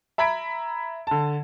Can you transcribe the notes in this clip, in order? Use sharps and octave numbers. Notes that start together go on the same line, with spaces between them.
E5 A#5 B5 G#6 B6 D7
D3 A5